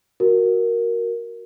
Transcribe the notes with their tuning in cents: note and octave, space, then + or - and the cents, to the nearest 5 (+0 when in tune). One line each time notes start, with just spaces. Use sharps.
F#4 +0 A#4 +0